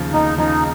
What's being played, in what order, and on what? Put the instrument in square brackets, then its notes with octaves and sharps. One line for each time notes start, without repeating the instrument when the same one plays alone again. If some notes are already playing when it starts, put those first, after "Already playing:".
Already playing: [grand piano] D#2 C#3 F3
[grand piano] D#2 [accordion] D#4
[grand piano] C#3 F3 [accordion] D#4